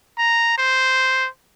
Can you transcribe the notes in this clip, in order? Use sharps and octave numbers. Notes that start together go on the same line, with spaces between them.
A#5
C5